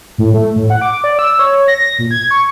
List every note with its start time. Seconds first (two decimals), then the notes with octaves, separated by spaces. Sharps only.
0.18 A2
0.34 A3
0.56 A2
0.70 F#5
0.81 D6
1.04 D5
1.19 E6
1.39 C#5
1.68 A#6
1.99 A#2
2.11 G#6
2.31 C#6